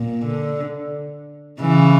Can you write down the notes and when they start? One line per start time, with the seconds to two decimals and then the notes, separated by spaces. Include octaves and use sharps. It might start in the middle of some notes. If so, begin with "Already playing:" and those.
Already playing: A#2
0.26 D3
1.61 C#3 E3